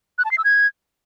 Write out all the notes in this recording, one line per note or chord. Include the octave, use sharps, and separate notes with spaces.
F#6
A5
C7
E6
G#6